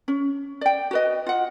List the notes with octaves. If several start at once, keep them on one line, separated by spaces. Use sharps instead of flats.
C#4
D5 G5
F#4 B4 D#5
F4 F#5